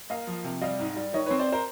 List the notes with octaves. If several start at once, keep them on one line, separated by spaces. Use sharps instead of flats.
A#3 D#5 F5
F3
C3
G3 D#5 F5
G#2
G3
D#3 C#5 D#5
C4 B4 C#5
C5 D5
A#4 C5